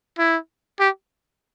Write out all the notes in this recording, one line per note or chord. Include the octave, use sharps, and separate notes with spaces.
E4
G4